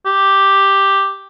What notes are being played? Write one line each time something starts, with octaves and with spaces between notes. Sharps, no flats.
G4